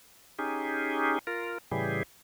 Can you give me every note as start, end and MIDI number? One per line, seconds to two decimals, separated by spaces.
0.39 1.19 61
0.39 1.19 63
0.39 1.19 67
0.39 1.19 68
1.27 1.58 65
1.27 1.58 70
1.71 2.03 45
1.71 2.03 49
1.71 2.03 52
1.71 2.03 55
1.71 2.03 67
1.71 2.03 68